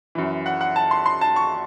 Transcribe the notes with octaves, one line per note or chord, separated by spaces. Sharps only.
F#2 E3
F#5
F#5
A5
C6
C6
A5
C#6